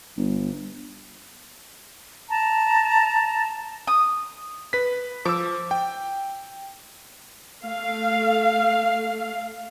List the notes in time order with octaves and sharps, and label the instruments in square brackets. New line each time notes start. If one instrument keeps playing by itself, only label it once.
[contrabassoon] G1
[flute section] A5 A#5
[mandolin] D#6
[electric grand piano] B4 B6
[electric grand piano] F3 E6 [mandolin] D6
[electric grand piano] G5
[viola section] A3 F5